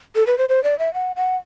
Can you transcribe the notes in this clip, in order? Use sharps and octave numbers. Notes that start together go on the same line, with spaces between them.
A4
B4
C5
C5
D5
E5
F#5
F#5